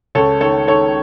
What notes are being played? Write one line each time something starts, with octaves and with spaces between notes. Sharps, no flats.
C#2 A4 C#5
D#3 A4 C#5
D#3 A4 C#5